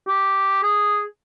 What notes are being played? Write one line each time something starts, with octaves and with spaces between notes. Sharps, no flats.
G4
G#4